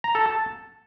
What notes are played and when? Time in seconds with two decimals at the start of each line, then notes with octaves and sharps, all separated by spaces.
0.04 A#5
0.15 A4
0.26 A5